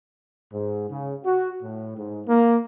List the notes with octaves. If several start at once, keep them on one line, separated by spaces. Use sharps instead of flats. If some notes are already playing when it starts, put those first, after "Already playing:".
G#2
C#3
F#4
A2
G#2
A#3